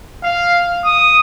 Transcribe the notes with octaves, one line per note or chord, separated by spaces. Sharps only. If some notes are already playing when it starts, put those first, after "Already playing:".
F5
D#6